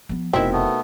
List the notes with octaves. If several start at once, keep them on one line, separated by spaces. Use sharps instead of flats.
F3 B3
F1 B2 C4 D#4 E4 A#4 E5
A3 B3